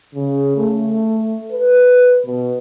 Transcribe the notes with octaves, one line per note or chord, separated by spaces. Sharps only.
C#3
A3
B4
B2